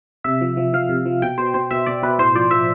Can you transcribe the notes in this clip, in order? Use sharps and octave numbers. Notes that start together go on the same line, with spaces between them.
C3 E5
F3
F3
F3 F5
C3
F3
B2 G5
B2 C5
B2 C5
B2 E5
B2 D5
B2 B4
A2 C5
F3 D5
F3 E5